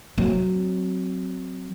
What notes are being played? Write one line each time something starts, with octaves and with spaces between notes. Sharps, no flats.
F#3 C4